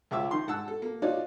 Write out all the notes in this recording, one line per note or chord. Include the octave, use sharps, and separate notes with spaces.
C#2 F4 E5 C#6 D6 E6
D#3 C6
G#2 F#5 A5 E6
A4
A#3
D#4 F4 F#4 C#5 D5